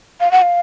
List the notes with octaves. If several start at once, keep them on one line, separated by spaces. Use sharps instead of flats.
F5
F#5
F5